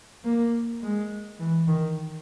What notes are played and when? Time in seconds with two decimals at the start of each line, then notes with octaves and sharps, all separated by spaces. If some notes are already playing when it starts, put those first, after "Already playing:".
0.25 A#3
0.83 G#3
1.40 E3
1.68 D#3